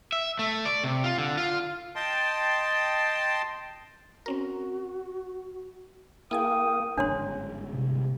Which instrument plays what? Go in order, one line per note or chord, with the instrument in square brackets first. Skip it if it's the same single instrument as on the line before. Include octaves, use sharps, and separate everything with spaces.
[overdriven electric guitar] E5
A3
D5
C3
F4
D3
F4
[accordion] D#5 G5 A5 C6
[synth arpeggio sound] C4 C#4 A#4 [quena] F#4
[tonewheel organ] A#3 [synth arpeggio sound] E4 G#4 G#5 [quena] G5 [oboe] D#6
[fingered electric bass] G1 G#2 C#3 [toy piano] D4 C#5 C6
[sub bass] C3